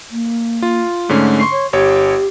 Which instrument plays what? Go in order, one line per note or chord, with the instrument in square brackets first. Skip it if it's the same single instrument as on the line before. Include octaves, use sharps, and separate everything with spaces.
[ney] A#3
[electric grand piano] F4
[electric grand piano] G#2 D3 C#4 [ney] A3
[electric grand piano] C6 C#6 C7
[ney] C#5
[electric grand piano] G1 C#5 [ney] G4